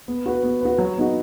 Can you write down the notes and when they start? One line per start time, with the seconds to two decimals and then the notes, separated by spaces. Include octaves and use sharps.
0.08 B3
0.26 F#4 B4
0.43 B3
0.61 F#4 B4
0.78 F#3
0.97 B3 D#4 F#4